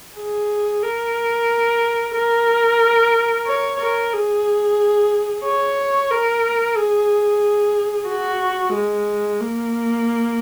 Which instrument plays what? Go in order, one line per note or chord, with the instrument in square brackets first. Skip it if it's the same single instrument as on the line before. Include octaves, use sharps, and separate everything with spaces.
[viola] G#4
A#4
A#4
C#5
A#4
G#4
C#5
A#4
G#4
F#4
G#3
A#3